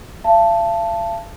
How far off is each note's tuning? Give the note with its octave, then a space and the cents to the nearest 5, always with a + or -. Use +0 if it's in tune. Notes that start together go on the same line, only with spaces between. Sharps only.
F5 -45 A5 +0